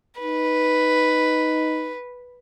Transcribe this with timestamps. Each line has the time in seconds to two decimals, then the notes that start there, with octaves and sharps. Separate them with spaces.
0.21 D#4 B4